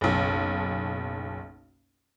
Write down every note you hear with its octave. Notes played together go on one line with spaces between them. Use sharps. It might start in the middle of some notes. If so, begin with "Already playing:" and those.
F#1 B1